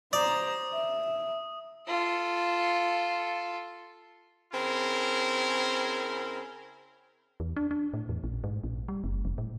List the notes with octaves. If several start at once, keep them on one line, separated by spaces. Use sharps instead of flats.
C5 D5 A#5 D#6
E5
F4 A4
C#3 C4 E4 A#4
E2
D4
D4
A2
E2
A#1
G#2
A#1
G3
F#1
F1
A2